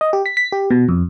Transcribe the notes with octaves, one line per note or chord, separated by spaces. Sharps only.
D#5
G4
B6
B6
G4
B2
F2